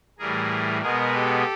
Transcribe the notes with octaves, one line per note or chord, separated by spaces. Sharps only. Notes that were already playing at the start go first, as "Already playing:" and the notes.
A2 E3 G3 G#4 A#4
B2 G#3 B3 G#4 A#4
G4 A4